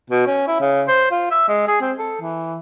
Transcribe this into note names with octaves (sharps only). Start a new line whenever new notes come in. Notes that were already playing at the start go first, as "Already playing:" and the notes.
B2
C#4
E4
C#3
C5
F4
E5
G#3
G#4
C4
A4
E3